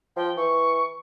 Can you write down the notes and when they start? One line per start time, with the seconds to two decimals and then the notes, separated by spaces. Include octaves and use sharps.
0.16 F3 G5
0.37 E3 C#6